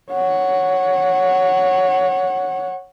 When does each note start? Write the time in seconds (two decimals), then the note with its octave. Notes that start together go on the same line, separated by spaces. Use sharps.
0.11 C#5 F#5